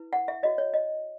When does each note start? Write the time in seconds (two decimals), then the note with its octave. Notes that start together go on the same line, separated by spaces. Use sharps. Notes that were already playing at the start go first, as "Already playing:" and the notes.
Already playing: E4 B4
0.13 F#5
0.28 E5
0.43 F#4 C#5 D#5
0.58 C#5
0.74 D#5